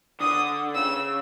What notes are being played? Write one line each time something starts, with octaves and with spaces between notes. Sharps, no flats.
D3 D#6
C#3 E6